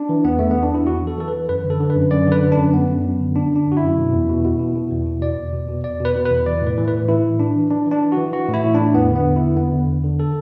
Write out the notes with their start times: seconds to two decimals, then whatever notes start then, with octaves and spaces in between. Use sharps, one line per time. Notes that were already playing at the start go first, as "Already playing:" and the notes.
Already playing: D4
0.09 E3
0.24 E2 B3
0.39 E2 A3
0.51 E2 B3
0.63 D4
0.71 E2 E4
0.87 E2 F#4
1.02 E3 A4
1.18 E3 A4
1.28 B4
1.33 E3
1.49 F#2 B4
1.64 D3
1.70 A4
1.80 D3
1.90 B4
1.95 F#2
2.11 F#2 D5
2.27 D3
2.32 B4
2.42 D3
2.52 D4
2.58 F#2
2.73 F#2 B3
2.89 F#2
3.04 F#2
3.20 D3
3.35 D3 D4
3.51 D3 D4
3.67 F#2
3.72 F#4
3.77 E4
3.82 F#2
3.97 B2
4.13 E2
4.29 B2
4.44 B2
4.59 B2
4.75 B2
4.91 E2
5.06 B2
5.22 B2 D5
5.38 E2
5.53 B2
5.69 B2
5.84 E2 D5
6.00 B2
6.05 B4
6.15 B2
6.25 B4
6.31 E2
6.46 E3 D5
6.62 A2 B4
6.77 E3
6.88 B4
6.93 A2
7.08 E3 E4
7.24 A2
7.40 E3 D4
7.55 E3
7.71 E3 D4
7.86 E3
7.91 D4
8.02 E3
8.12 F#4
8.17 E3
8.33 E3 F#4
8.49 A2 E4
8.64 A2
8.74 D4
8.80 A2
8.95 E2 B3
9.11 D3 B3
9.26 E2
9.36 E4
9.41 D3
9.57 E2 B3
9.73 D3
9.88 E2
10.04 D3
10.20 A4